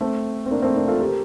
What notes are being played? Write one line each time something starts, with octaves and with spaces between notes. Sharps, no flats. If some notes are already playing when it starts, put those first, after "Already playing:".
A3 C4
C4
A#3 D4
A3 C4
A#3 D4
F4 A4
G4 A#4